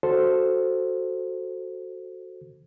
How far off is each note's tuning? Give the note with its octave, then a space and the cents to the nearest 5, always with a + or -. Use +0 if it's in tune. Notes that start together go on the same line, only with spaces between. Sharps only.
F#4 +0 A4 +0 C5 +0